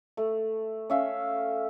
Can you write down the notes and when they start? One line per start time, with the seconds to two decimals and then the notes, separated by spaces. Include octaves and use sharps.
0.17 A3
0.90 C#4 E5 F5